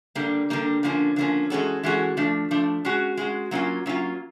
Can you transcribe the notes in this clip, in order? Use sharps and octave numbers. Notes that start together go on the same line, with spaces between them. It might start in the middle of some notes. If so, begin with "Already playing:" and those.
D3 G3 A#3
D3 G3 A#3
D3 F3 A#3 C#4
D3 F3 A#3 C#4
E3 G#3 C#4 F#4 A4
E3 G#3 C#4 F#4 A4
F3 A3 D4
F3 A3 D4
G#3 C#4 F#4
G#3 C#4 F#4
F#3 A#3 C#4 F4
F#3 A#3 C#4 F4